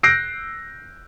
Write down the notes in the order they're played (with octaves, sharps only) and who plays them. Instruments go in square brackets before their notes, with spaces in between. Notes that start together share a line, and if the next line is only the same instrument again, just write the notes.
[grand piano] E6 F#6 G6 A#6 C7 D7